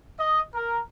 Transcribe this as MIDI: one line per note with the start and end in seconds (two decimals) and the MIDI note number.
0.18 0.41 75
0.55 0.78 70